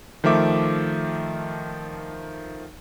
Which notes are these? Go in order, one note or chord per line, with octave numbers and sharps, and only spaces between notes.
D#3 F3 A3 E5 D6